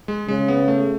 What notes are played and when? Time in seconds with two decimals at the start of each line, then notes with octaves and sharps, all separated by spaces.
0.08 G#3
0.28 C#3 G#3
0.48 B3
0.68 A3